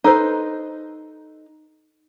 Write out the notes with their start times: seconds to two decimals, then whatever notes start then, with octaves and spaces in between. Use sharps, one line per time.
0.04 D#4 A4 B4 C5